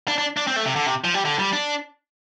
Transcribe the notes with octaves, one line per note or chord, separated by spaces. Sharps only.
D4
D4
D4
C4
A3
C3
D3
C3
F3
G3
D3
G3
D4